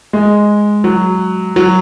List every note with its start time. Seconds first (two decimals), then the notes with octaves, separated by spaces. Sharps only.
0.13 G#3
0.84 F#3
1.56 F#3